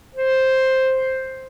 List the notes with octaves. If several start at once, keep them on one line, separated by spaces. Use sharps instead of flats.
C5